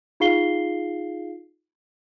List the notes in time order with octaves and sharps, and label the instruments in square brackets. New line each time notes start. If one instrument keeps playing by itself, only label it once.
[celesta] D#4 F4 G#4 F5 C7 G7